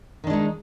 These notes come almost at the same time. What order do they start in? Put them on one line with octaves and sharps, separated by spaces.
D#3 D4 G#3 D#4